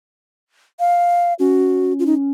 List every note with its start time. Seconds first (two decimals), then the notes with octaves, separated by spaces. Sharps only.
0.80 F5
1.39 C#4 F#4
1.99 F4
2.06 D#4